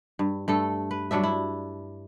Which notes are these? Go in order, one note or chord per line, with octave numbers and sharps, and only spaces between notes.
G2
G2 A3 A4
B4
G2 F#3 D4 E5
E4